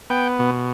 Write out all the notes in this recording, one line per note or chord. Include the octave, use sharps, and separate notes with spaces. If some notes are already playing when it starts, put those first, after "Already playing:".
B3 G5
B2